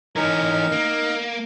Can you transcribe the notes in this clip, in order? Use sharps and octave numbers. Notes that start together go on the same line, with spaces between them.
E3 C#4 D#4 A#4
A#3